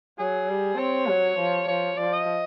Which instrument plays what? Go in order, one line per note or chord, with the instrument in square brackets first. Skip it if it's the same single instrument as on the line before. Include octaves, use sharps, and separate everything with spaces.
[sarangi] F#3 [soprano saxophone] G#4
[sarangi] G3
[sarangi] C4 [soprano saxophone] C#5
[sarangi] F#3
F3
[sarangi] F3 [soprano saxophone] C#5
[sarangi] F3 [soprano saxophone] D5
[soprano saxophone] D#5